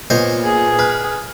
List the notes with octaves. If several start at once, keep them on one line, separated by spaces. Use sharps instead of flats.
A#2 B3 C5 C#5 D#5
G#4
B4 F6